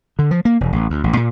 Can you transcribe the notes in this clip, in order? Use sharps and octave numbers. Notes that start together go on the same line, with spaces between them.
D3
F3
A#3
E1
A1
D2
A1
A#2